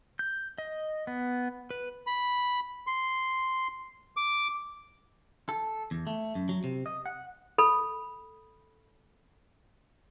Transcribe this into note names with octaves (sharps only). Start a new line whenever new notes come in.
G6
D#5
B3
B4
B5
C6
D6
A4
E2
A3
F#2
F#3
C3
D#5
F#5
A4 B5